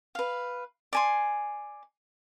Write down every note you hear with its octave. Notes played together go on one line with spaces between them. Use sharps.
B4 F5
D5 G#5 C6